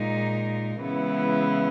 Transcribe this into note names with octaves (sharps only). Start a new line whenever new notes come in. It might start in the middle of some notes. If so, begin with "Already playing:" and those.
Already playing: A#2 G#3 D#4 A#4
C#3 E3 G#3 B3 E4